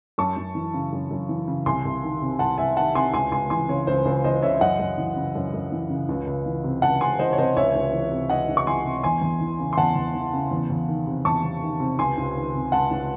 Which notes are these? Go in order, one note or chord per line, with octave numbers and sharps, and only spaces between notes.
F#2 A5 C#6
F#2
E3
C#3
F#2
F#2
E3
C#3
C2 G#5 C6
C2
D#3
C3
C2 F#5 A5
C2 E5 G#5
D#3 F#5 A5
C3 G#5 C6
C#2 G#5 C6
C#2 G#5 C6
E3 G#5 C6
C#3 C#5
C#2 C5
C#2 C5
E3 C5 D#5
C#3 C#5 E5
F#2 D#5 F#5
F#2
E3
C#3
F#2
F#2
E3
C#3
C#2
C#2
E3
C3
C#2 F#5 A5
C#2 G#5 C6
E3 C5 D#5
C#5
C3 C5 D#5
C#2 C#5 E5
C#2
E3
C3
C#2 D#5 F#5
C#2
C#6
E3 G#5 C6
C3
E2 G#5 C6
E2
E3
C#3
C6
E2 F#5 A5
E2
E3
C#3
E2
E2
D#3
C3
E2 A5 C#6
E2
D#3
C3
C#2 G#5 C6
C#2
D#3
C3
C#2 F#5 A5
C#2